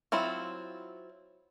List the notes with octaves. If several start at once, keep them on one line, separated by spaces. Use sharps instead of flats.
F#3 C4 E4 F4